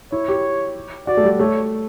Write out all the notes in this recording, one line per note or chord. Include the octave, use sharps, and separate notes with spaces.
E4 C#5
G4
F#4 D5
A3
G3
A3 C#5